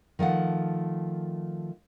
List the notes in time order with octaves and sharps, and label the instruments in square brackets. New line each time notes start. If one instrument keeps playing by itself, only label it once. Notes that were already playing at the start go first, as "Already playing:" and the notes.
[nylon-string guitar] D#3 F3 A3 F#5